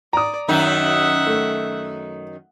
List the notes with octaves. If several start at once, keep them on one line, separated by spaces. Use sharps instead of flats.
D5 A#5 D#6
F#2 D#3 D#4 E5 F#5
A3